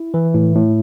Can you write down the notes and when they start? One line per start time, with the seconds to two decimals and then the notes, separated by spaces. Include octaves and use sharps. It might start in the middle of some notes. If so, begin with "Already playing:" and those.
Already playing: E4
0.14 E3
0.34 A2
0.55 A2